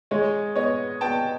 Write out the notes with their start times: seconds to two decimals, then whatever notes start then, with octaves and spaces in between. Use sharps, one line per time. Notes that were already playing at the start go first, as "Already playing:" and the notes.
0.11 G#3 C#5 D#5
0.56 B3 C#5 D#5
1.01 B3 G5 A5